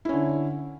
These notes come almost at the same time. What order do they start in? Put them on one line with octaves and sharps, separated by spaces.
E4 C#4 D3